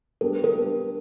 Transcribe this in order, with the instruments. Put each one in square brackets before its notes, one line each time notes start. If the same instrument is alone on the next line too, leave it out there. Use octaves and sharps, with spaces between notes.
[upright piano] G3 B3 D4 [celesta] A#4
[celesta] A#4
[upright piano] G3 B3 D4